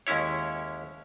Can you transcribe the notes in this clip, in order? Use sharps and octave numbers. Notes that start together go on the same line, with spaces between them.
D#2 G#3 C#4 E4 C#5